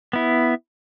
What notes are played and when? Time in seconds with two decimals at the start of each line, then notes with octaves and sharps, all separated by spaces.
0.13 B3 E4